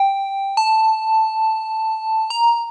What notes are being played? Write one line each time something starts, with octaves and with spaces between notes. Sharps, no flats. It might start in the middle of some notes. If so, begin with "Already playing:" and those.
Already playing: G5
A5
A#5